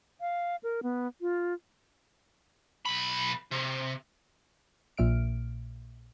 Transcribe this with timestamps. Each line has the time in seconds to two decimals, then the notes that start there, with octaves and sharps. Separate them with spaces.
0.21 F5
0.63 A#4
0.83 B3
1.21 F4
2.85 B1 B5
3.51 C3
4.98 A#1 A#2 E5 F6 D7